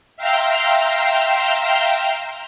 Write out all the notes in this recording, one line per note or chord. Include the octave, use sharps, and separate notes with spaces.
E5 F5 G5 A#5 C6 E6